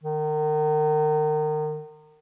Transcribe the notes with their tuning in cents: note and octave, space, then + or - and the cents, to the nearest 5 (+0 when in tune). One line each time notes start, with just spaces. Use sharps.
D#3 -30